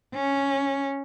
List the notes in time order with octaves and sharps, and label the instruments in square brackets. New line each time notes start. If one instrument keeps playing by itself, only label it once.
[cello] C#4